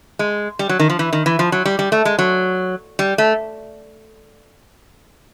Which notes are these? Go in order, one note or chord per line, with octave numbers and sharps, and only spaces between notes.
G#3
G3
F#3
D#3
F3
E3
D#3
E3
F3
F#3
G3
G3
A3
G#3
F#3
G3
A3